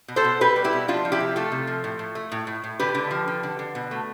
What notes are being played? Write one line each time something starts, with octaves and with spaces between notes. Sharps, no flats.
B2
A4 C5
B2
B2 G4 B4
G3
E4 G4
B2
F3 D4 F4
F3
E4 G4
C3
A3 F4 A4
C3
F3
A2
A2
A3
A2
A2
A2
D3 G4 B4
D3
F3
D3
D3
D3
B2
A3